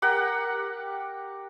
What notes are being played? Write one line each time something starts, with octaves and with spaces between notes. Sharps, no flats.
G4 A#4 F#5